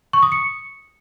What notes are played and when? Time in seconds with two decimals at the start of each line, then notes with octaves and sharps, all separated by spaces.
0.13 C#6
0.23 D#6
0.32 C#7